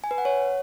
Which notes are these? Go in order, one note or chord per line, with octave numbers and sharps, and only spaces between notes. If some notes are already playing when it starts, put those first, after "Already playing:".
G#5
B4
F#5
C#5